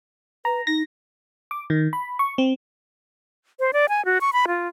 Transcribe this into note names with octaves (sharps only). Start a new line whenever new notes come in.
B4 A#5
D#4 A#6
D6
D#3
B5
C#6
C4
C5
D5
G#5
F#4
C#6
B5
F4